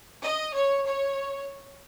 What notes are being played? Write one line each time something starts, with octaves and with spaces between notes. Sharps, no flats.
D#5
C#5
C#5